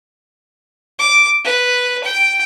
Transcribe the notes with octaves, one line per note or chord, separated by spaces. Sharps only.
D6
B4
G5